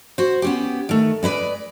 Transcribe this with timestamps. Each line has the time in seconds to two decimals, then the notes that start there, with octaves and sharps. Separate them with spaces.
0.18 F#4 C5
0.42 B3 C#4 G4
0.89 D#3 A3
1.23 G#3 E4 B4 D5